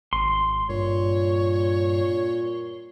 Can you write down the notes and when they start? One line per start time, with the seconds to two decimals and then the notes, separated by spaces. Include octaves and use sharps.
0.13 G#1 C6
0.69 G2 A#2 C#5